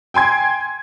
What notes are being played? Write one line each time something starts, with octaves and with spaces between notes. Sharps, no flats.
G5 G#5 C6 G#6